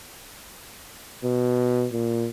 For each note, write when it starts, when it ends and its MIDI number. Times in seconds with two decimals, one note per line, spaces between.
1.24 1.86 47
1.93 2.28 46